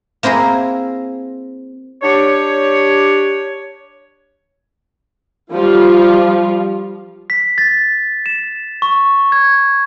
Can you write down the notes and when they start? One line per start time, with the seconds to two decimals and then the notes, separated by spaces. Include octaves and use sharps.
0.23 A#3 C4 E4 G#4 A#4
2.03 D4 G4 C#5
5.52 F3 G3 F4
7.30 B6
7.58 A6
8.26 E7
8.82 C#6
9.32 G#6